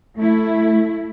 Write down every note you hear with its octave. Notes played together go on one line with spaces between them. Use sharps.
A3 E4